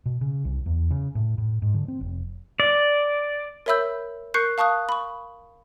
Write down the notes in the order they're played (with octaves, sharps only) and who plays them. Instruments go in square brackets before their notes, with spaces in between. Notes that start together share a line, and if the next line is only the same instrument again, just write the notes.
[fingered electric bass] B2
C#3
C2
E2
C#3
A2
A2
G#2
D3
C4
F1
[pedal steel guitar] D5
[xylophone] A#4 C#5 E5 B5 E6 G6
A#4 C#6 F#6 G6 C7 C#7
F5 A5 C#6 D#6 F#6
B5 C#6